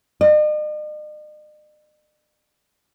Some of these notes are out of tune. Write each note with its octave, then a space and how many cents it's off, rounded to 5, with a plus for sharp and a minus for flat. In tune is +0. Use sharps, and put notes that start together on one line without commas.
D#5 -45